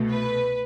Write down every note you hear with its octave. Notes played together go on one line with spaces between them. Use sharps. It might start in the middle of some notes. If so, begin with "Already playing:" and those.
Already playing: C2 B2 A3
B4